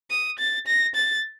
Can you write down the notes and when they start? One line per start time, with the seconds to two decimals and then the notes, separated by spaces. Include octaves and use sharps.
0.10 D#6
0.38 A6
0.66 A#6
0.95 A6